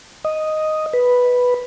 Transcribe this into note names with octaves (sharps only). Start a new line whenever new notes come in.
D#5
B4